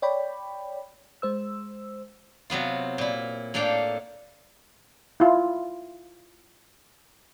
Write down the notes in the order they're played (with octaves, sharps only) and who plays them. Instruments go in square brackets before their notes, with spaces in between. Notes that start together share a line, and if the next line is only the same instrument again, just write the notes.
[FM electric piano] C#5 D5 G5 B5
G#3 C5 E6
[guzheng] C3 F#3 B3 F4
A#2 E4
A2 A#3 D4 A4 F5 G5
[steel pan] E4 F4